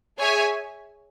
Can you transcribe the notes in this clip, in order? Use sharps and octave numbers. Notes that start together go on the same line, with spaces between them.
G#4 C#5 E5 G#5